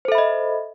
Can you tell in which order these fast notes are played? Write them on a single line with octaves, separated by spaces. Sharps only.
C5 A4 E5 B5 D#5